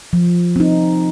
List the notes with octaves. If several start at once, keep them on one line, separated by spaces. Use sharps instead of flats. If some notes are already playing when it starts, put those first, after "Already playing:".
F3
C4 D#4